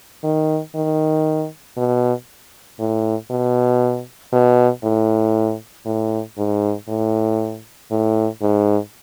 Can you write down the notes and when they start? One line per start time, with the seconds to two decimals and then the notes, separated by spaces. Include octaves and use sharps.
0.24 D#3
0.75 D#3
1.77 B2
2.79 A2
3.30 B2
4.33 B2
4.84 A2
5.85 A2
6.38 G#2
6.88 A2
7.91 A2
8.41 G#2